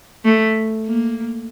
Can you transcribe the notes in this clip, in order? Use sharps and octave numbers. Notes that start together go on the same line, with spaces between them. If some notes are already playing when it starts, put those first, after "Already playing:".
A3
A#3